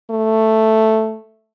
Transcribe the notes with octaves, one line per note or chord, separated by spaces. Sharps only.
A3